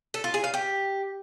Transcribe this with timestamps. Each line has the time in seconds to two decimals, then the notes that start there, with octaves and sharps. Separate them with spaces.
0.14 A4
0.24 F4
0.34 G#4
0.44 F5
0.54 G4